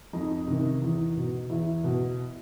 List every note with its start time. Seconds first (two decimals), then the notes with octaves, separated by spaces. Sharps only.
0.13 F2 D#4
0.47 C3 D#3
0.82 E2
1.16 B2
1.50 E2 E4
1.84 B2